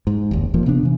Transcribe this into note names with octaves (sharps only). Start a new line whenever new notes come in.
G#2
F#1 D#2
D#1 A1 F3 A#3
C3 B3 D4
C3 E3